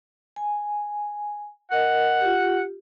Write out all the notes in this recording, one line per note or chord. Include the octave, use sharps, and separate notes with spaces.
G#5
A#4 D#5 F#5
F4 G4